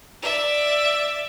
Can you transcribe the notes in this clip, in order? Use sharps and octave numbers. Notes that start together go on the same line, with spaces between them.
D5 E5